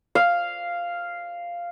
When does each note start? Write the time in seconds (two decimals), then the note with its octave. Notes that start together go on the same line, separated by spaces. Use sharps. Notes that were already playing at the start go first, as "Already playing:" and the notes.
0.15 F5